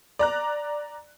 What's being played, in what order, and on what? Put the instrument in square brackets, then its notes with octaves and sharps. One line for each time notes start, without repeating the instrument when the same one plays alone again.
[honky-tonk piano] D5 A#5 F#6